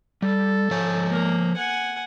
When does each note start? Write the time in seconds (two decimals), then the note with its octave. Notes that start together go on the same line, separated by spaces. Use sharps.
0.22 G3 A4
0.71 F3 C#5 G#5
1.08 A#3 A#4
1.56 F#5 G#5